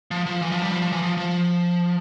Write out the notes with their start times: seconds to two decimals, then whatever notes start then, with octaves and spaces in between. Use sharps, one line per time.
0.11 F3
0.26 F3
0.42 E3
0.52 F3
0.62 G3
0.72 F3
0.82 F3
0.92 E3
1.02 F3
1.17 F3